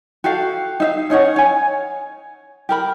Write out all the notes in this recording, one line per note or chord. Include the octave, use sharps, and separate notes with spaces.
F#4 G4 A4 F5
D#4 E5 F5
C#4 D#4 C#5 F#5
C#5 G#5
G4 A#4 B5